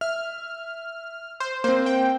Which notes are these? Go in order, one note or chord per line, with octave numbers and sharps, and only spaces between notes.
E5 F6
C5
A#3 C4 C5
G5